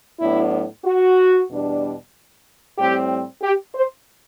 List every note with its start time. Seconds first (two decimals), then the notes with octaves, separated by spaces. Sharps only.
0.19 A2 F#3 B3 D4 E4
0.84 F#4
1.49 E2 B2 G3 D4
2.77 A2 G3 C4 G4
3.42 G4
3.74 C5